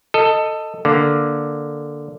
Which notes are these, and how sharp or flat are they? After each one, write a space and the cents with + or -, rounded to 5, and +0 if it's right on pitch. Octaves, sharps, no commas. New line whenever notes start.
A4 +15 D#5 +0
D3 +0 A#3 +0